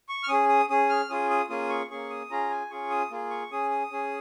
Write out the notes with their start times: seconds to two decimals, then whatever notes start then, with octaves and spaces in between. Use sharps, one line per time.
0.09 C#6
0.24 F6
0.29 C#4 G#4 D#6
0.49 D#6
0.70 C#4 G#4 D#6
0.90 F6
1.09 C#4 F4 G#4 D#6
1.30 D#6
1.49 A#3 C#4 F4 G#4 D#6
1.70 C#6
1.90 A#3 C#4 G#4 C#6
2.10 D#6
2.30 C#4 F4 G#4 A#5
2.50 G#5
2.71 C#4 F4 G#4 C#6
2.90 D#6
3.11 A#3 F4 G#4
3.30 C#6
3.51 C#4 G#4 D#6
3.71 D#6
3.91 C#4 G#4